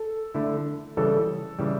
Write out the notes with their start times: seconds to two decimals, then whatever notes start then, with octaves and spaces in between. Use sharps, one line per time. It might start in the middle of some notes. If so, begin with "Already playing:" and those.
Already playing: A4
0.34 D3 A3 E4
0.97 C#3 E3 G3 A4
1.59 C#3 E3 G3